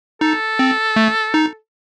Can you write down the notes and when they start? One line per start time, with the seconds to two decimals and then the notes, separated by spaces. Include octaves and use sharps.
0.21 D#4 A4
0.59 C4
0.96 A3
1.34 D#4